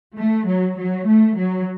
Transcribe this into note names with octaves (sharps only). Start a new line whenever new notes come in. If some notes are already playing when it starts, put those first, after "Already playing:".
A3
F#3
F#3
A3
F#3